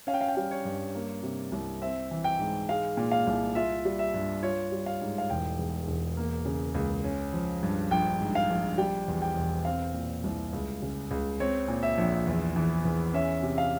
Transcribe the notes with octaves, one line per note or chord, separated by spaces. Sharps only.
C#4 F5
G5
F5
G5
G3 F5
C#5
G2
A#3
C3
C2
C4 E5
E3
G5
G#2
G#3 F5
A#2
F5
C2
F4 E5
G3
E5
G2
F4 C#5
G3
F5
G#2
F5
E1 G5
E2
E1
A#3
C#3
C#2
C#4
F3
G2
A#1 G5
G#2
F5
A#1
G3 G5
E2
G5
E1
C4 F5
A#2
C2
C#2
C#3
C#2
C4 C#5
A#2
E5
A#1
E2
E3
E2
C#4 E5
C3
F5